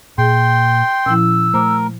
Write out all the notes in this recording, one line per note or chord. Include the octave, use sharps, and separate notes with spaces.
A#2 G#4 G5 C6
A#2 F3 C#4 E4 E6
A3 A#4 C5 D6